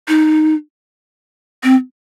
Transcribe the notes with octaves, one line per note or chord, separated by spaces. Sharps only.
D#4
C4